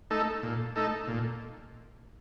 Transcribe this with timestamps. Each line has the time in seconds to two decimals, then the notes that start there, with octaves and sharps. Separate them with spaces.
0.11 A3 D#4 A4
0.43 A#2
0.76 A3 D#4 A4
1.08 A#2